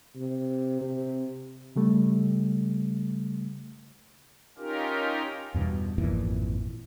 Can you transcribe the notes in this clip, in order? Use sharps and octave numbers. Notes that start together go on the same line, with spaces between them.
C3
C3
C#3 G3 A3
C#4 D#4 F4 G4 A#4
E2 G2 B2 E3
G#1 F2 A#2 E3